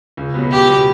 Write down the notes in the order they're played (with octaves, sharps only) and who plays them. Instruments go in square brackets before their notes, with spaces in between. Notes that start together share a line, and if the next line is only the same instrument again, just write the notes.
[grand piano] C#2
B2 F#3 B3
[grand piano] C#2 [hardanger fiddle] G4
[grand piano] B2 F#3 B3